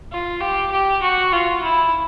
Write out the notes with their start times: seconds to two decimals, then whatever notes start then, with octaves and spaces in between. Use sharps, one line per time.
0.12 F4
0.41 G4
0.71 G4
1.02 F#4
1.32 F4
1.63 E4